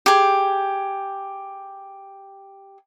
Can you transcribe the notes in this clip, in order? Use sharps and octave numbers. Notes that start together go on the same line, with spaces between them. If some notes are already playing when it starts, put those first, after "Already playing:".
G4 G#4